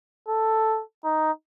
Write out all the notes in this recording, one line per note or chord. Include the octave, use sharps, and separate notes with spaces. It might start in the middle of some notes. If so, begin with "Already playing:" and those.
A4
D#4